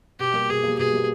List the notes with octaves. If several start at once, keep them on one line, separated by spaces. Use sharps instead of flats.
B2 G4
G3 A#3
B2 G#4
G3 A#3
B2 G#4
G3 A#3